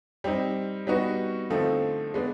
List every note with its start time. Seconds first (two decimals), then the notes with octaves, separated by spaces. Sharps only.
0.24 G3 C4 D#4
0.87 G3 B3 D#4 F#4 B4
1.50 D3 F3 A3 C4 D#4
2.14 G#3 B3 D4